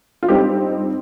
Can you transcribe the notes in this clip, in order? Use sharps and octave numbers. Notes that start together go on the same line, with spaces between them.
F4
G2 G3 C4 D#4 G4